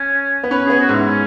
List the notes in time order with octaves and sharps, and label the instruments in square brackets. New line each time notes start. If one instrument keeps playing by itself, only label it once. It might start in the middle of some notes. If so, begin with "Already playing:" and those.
Already playing: [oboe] C#4
[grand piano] B3
[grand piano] C#4 [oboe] B4
[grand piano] B3 [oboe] G#4
[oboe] F#4
[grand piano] G#2 [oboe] E4
[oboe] C#4